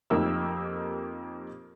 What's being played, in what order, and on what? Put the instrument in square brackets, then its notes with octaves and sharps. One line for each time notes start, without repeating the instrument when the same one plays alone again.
[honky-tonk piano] F2 A#3 D#4 G4 E6 F6